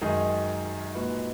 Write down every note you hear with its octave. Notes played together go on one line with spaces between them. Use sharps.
F#2 D#3 G#3 D#4 G#4
A#2 G#3 D#4 F#4 B4